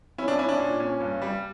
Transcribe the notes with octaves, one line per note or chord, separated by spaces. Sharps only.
C#4 E4
D4
C#4 E4
D4
A#2
C#4
G2
G3